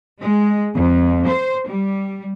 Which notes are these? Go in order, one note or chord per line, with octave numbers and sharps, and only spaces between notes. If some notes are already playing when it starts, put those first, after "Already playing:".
G#3
F2
C5
G3